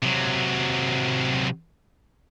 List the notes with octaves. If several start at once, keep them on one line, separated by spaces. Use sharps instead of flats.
C3 F#3